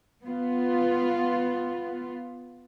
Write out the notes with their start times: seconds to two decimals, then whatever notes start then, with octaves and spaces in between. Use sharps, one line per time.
0.25 B3 F4